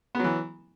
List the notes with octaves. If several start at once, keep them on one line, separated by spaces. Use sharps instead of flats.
E3 F#3 B3